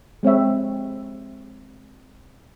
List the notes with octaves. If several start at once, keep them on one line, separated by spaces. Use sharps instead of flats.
G#3 C4 C#5 E5